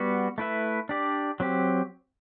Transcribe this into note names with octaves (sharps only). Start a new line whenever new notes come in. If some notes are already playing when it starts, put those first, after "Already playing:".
Already playing: G3 B3 F#4
A3 E4 B4 E5
D4 G4 D5
F#3 C4 G4